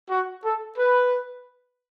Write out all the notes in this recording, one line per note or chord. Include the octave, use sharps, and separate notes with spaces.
F#4
A4
B4